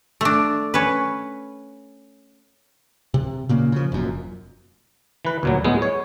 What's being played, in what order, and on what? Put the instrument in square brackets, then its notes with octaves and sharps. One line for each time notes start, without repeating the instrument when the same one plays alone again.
[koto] A3 D4
C#4 B4
[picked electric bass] C3
A#2 C#3 A#3
C#3 F3
F1 F#2 A#2
[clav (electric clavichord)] E3 B4
D2 A#2 F#3
A2 G#3 B3
C#5